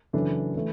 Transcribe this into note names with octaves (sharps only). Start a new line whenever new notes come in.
F#1 F#2 E3 D4 A4
E3 A3